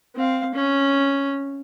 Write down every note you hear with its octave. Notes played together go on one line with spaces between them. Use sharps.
C4 F5
C#4